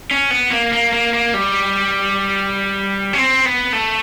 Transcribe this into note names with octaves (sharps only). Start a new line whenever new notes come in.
C#4
B3
A#3
A#3
A#3
A#3
G3
C#4
C4
B3
A3